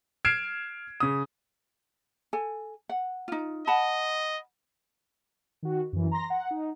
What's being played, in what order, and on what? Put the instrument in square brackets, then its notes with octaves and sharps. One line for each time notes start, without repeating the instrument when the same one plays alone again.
[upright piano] F6 G#6 C7 D7 E7
C#3 D#6
[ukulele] A4 G#5
F#5
D#4 F4
[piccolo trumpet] D#5 [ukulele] F#5 A5 B5
[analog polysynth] D#3 F#4
F#2 E3
A#5 C6 A#6
F#5
D#4